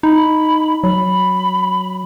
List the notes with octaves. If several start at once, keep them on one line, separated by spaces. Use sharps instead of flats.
D#4 B5
F#3 B5